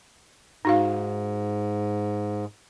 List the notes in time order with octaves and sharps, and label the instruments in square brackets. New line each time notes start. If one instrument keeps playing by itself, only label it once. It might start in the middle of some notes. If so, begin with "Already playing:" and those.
[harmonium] G#2 [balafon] D#4 F#4 F5